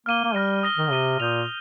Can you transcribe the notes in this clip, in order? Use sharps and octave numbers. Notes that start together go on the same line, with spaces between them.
A#3 F6 D#7 G7
A#3
G3 F6 A#6 D#7
D#6 A#6 G7
D#3
C3 A#6 D#7 G7
A#2 D#6 G6 A#6 F7